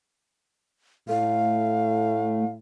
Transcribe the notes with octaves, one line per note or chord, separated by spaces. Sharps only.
A2 A3 F5